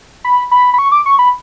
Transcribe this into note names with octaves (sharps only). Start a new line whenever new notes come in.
B5
B5
B5
C#6
D6
C#6
B5